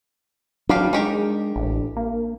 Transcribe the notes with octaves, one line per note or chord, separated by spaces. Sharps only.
F#3 G3 D4 G4 F5
G#3 D#4 G4 A#4
A1
A#3